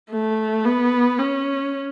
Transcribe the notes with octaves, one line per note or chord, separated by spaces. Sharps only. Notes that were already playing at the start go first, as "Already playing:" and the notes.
A3
B3
C#4